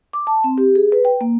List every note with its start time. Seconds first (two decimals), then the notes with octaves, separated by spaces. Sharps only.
0.13 D6
0.27 A5
0.44 C4
0.58 G4
0.75 G#4
0.92 B4
1.05 G5
1.21 A#3